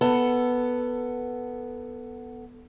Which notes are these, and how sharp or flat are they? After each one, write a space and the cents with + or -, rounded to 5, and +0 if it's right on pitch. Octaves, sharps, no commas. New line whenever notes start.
B3 +0 A4 +15